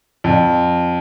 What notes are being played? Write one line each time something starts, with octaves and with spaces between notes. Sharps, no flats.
F2